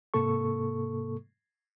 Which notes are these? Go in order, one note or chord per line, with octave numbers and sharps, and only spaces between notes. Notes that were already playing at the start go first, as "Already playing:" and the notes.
G#2 C3 A#3 A4 C#6